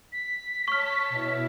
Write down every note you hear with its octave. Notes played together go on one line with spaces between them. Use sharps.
B6
C#5 A5 C#6 F6
B2 E4